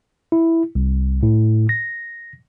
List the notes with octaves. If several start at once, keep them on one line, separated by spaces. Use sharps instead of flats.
E4
C2
A2
A#6